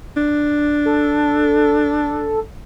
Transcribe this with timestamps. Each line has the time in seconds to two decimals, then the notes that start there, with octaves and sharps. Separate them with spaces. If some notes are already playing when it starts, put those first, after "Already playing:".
0.17 D4
0.85 A4